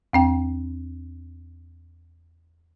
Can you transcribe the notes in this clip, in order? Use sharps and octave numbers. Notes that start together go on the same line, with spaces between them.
E2 C4 G5